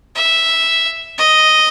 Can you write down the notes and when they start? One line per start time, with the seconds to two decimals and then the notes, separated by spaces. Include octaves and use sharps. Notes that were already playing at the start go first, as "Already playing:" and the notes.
0.15 E5
1.18 D#5